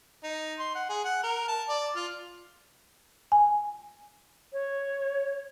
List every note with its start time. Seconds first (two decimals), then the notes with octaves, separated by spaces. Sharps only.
0.23 D#4
0.60 C6
0.75 F#5
0.89 G#4
1.05 F#5
1.23 A#4
1.48 A5
1.69 D5
1.96 F4
3.32 G#5
4.53 C#5